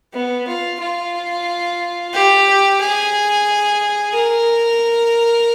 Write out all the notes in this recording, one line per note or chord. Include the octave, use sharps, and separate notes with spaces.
B3
F4
F4
G4
G#4
A#4